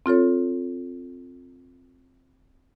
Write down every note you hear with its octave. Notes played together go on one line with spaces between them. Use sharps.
C4 F4 A4 C#5